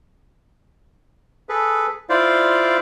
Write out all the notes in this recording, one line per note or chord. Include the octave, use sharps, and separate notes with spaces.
G#4 A4 B4
E4 F4 C5 D5 F5